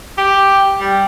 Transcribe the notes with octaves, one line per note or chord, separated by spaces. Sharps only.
G4
G3